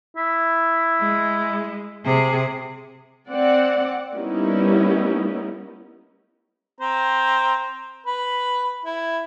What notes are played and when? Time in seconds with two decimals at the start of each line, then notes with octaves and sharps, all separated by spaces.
0.17 E4
1.01 G#3
2.05 C3 G#4
3.28 C4 D5 F#5
4.15 G3 A#3 B3 C#4 D#4 E4
6.81 C4 C5 A#5
8.06 B4
8.86 E4